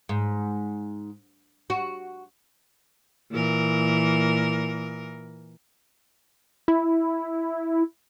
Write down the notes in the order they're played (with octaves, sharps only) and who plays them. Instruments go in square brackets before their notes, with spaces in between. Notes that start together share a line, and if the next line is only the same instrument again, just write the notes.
[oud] G#2
F#4
[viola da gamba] A#2 E3 A#4
[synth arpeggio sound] E4